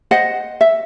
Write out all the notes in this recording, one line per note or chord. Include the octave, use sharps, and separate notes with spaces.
C5 D#5 F#5
E5